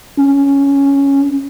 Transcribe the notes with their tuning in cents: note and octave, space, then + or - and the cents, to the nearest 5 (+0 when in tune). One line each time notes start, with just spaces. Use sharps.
C#4 +5